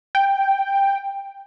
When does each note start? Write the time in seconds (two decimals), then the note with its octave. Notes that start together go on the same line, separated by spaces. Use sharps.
0.15 G5